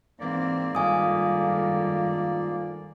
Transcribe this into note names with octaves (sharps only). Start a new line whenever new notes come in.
G#2 E3 A#3 C4 D5
G2 D#3 F4 A4 F5 G#5 D#6